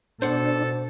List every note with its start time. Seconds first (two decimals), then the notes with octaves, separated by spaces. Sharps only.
0.22 B2 D4 A4 C5 F#5